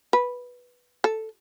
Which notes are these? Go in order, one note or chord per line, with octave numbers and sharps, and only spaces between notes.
B4
A4